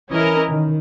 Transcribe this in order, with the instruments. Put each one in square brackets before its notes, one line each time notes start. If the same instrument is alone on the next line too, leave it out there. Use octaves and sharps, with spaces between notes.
[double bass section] E3 [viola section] C#4 E4 A#4 D#5
[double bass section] D#3